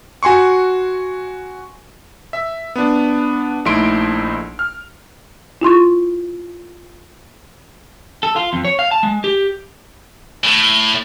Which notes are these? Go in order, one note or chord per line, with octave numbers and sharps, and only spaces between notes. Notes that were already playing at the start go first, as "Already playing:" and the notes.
F#4 G#5 C6 C#6
E5
B3 D4
A#1 A3 D#4 E4 C6 D7
F6
E4 F4 C6 C#6
A4
F4
F2
C#5
F5
A5
G#3
G4
A2